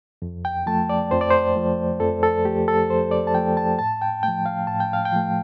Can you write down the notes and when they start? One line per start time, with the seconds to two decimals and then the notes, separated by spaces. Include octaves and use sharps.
0.22 F2
0.45 G5
0.66 F3 A3 A5
0.90 D5
1.11 F2 C5
1.21 D5
1.30 C5
1.56 F3 A3
2.00 F2 A4
2.23 A4
2.45 F3 A3 G4
2.68 A4
2.89 F2 C5
3.11 D5
3.27 A5
3.34 F3 A3 G5
3.57 A5
3.79 A2 A5
4.02 G5
4.23 F3 A3 G5
4.46 F5
4.67 A2 A5
4.80 G5
4.93 F5
5.05 G5
5.12 F3 A3